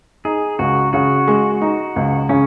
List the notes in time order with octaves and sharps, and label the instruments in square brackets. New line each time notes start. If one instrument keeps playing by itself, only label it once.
[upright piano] D#4 [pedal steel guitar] G#4
[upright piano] C#2 [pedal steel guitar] F#4
[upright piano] C#3 [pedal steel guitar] F#4
[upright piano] G#3
D#4
C#2
[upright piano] C#3 [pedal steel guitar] C#4